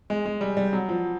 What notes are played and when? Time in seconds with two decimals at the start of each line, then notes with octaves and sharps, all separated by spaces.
0.10 G#3
0.26 G#3
0.41 G3
0.57 G3
0.73 F#3
0.89 F3